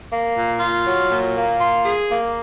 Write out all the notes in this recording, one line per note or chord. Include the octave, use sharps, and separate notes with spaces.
A#3
A#2
F4
F#3
A#2
A#3
F4
G#4
A#3